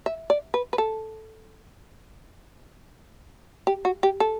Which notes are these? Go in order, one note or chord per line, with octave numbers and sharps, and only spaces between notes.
E5
D5
B4
B4
A4
G4
F#4
G4
A4